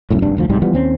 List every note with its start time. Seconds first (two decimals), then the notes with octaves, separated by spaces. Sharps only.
0.10 C2 F#2 A2
0.22 F1 G2 D4
0.37 F1 D2 F3
0.50 C2 G#2 G3
0.62 E3 F3 G3 B3
0.73 D#2 C4 C#4